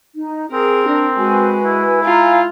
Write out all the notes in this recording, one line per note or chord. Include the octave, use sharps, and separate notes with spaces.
D#4
C4 G#4 A#4
D4
G#3 F#4 B4 G#5
E4
F4 F5 G#5 A#5